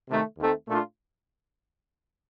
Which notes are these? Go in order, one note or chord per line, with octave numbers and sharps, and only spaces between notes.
C3 D#3 A3
D#2 D#3 A3 C4
A#2 A3 D4 F4